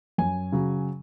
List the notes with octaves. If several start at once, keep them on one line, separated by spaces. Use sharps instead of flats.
F#2 G#5
C#3 F#3